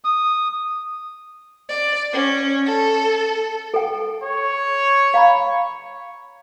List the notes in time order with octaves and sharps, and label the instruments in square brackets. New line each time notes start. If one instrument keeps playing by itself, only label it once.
[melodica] D#6
[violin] D5
C#4
A4
[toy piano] A4 G5
[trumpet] C#5
[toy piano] F5 A#5 B5